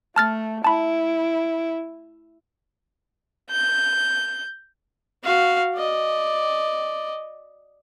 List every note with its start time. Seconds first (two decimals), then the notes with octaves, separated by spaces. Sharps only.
0.16 A3 A5 F6 A6
0.64 E4 A5 B5
3.51 G6
5.24 F#4 F5
5.75 D5 D#5